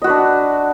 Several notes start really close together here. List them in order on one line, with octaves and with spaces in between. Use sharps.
D#5 F#4 B4 D4